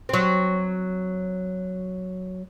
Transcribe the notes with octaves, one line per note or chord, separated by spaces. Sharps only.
F#3 C4